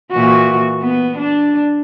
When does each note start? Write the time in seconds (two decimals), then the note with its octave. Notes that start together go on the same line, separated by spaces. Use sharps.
0.11 A#2 E3 F#4
0.82 B3
1.17 D4